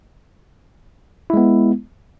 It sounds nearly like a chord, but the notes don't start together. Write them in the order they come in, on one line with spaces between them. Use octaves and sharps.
E4 G#3 B3